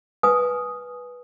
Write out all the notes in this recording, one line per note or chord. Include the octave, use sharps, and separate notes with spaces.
B4 G#5 D#6